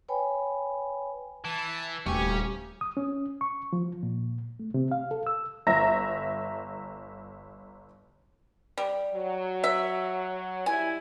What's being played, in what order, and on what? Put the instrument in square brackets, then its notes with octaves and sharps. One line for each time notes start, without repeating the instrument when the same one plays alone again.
[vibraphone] B4 C#5 G5 G#5 B5
[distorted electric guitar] E3 [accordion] A5
[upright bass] D#1 [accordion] D2 G4 C#6 [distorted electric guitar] C#4 G#5
[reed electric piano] D#6
C#4
C#6
F3
A#2
A3
C3
F5
A4
E6
[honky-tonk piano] G1 E5 A#5 A#6
[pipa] G3
[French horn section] F#3
[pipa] E5
[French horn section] D#3 G3 E4 [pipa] G#5